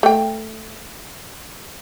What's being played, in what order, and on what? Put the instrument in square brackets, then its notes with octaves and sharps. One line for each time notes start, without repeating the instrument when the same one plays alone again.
[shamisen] A3 G5